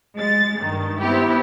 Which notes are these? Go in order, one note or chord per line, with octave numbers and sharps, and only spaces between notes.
G#3 A6
G2 D#3
B3 C4 E4 G4